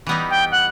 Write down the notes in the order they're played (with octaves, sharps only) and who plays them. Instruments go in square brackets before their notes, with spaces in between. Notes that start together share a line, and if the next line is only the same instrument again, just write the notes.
[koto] E3 G3 B3 D#4
[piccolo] G5
F#5